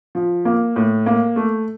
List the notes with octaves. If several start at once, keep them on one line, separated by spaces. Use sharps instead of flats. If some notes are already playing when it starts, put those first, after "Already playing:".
F3
A#3
A2
A#3
A3